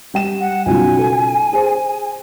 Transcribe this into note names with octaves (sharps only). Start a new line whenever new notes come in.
G3 G5 E7
F#5
B1 C#3 F4 G#5
A4
G#4 C5